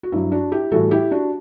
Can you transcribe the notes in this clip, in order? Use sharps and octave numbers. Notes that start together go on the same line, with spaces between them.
F#4
G2 F#3 E4
D4 F#4
E4 G4
A2 E3 G3 F#4 A4
E4 G4
D4 F#4